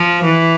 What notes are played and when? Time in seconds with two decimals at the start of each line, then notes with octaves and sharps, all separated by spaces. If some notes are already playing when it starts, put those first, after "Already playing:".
Already playing: F3
0.25 E3